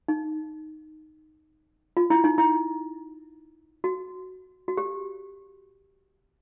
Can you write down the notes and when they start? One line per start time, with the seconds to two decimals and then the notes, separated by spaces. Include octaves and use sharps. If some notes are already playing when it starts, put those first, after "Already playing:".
0.08 D#4
1.97 F4
2.10 E4
2.24 D#4
2.38 E4
3.84 F#4
4.68 F#4
4.77 G4